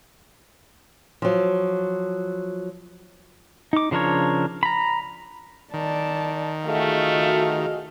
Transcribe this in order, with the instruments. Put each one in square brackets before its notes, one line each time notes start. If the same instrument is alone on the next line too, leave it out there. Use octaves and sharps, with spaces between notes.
[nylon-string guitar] F3 F#3
[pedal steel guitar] D#4 D6
C#3 F3 D4 A#4 C#5
A#5 B5
[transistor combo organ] D#3 [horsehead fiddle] D5 A5
[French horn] A3 [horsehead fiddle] F4 F5 [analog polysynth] F#4 G#4 D#5